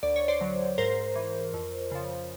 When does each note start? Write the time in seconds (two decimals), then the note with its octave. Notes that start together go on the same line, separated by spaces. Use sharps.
0.03 D2 D5
0.16 C#5
0.28 C5 D5
0.40 D3 F#3
0.78 G#2 A#4 C5
1.16 E3
1.53 F2
1.91 C#3 F3